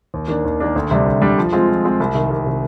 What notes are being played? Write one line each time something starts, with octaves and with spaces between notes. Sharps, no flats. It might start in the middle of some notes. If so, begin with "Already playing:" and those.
D#2
D#3 A#3 D4
D#2
D#3 A#3 D4
D2
C3 G3 D4
D2
C3 G3 D4
F3
G#3 C4 F4
F3
G#3 C4 F4
C2
C3 D#3
C2
C3 D#3